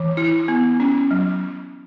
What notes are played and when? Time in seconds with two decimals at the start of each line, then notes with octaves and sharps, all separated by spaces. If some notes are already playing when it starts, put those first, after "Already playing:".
Already playing: E3
0.17 E4
0.48 B3
0.80 C#4
1.11 F#3